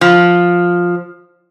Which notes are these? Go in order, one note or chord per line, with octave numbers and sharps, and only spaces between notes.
F3